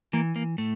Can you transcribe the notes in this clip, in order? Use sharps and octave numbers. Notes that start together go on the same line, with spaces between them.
E3 A#3
A#3
A2 A3